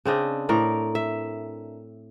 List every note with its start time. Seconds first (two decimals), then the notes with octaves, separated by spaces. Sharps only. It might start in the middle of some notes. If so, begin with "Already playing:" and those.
0.05 C#3 C4 D4 D#5
0.49 A2 C4 A#4 D5
0.95 E5